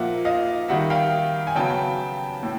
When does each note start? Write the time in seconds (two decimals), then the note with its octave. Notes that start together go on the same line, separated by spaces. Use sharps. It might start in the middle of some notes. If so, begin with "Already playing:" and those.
Already playing: A#2 F3 A#3 E5 F#5
0.25 D#5 F5
0.68 D#3 G3 A#3 E5 F#5
0.90 F5 G5
1.47 G#5
1.55 C#3 F#3 B3 G5 A5
2.43 A2